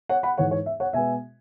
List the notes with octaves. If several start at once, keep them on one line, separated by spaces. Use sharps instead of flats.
C#5 F#5
F#5 B5
G#2 E3 G#3 C#5 F#5
C#5
E5
C#5 F#5
B2 G#3 B3 E5 G#5